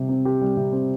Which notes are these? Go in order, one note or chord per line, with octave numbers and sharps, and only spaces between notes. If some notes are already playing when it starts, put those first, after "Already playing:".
Already playing: C3 G3 G4
C4
G4
G3
C3
C4